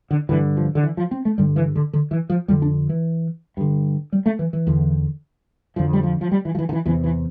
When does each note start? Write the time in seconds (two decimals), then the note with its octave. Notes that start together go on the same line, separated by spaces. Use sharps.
0.11 D3
0.29 G2 D3 E3
0.57 F3
0.75 D3
0.83 E3
0.97 F3
1.11 C4
1.25 A3
1.38 G2 D3 G3
1.56 E3
1.75 D3
1.93 D3
2.11 E3
2.30 F3
2.48 F2 D3 G3
2.62 D4
2.89 E3
3.57 G2 D3
4.12 G3
4.26 A3
4.39 E3
4.53 E3
4.67 E2 D3
5.76 F2 D3 F3
5.93 G3
6.03 F3
6.21 F3
6.31 G3
6.45 E3
6.55 F3
6.59 E3
6.69 D3
6.73 E3
6.86 E2 C3 E3
7.04 E3